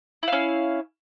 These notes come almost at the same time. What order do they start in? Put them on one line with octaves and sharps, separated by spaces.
E4 F5 C#4